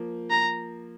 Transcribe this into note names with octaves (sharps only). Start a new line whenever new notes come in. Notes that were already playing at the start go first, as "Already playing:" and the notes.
Already playing: F3 A#3
A#5